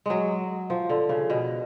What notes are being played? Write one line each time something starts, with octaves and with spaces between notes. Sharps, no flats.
F#3 G#3
F3
D3
C#3
B2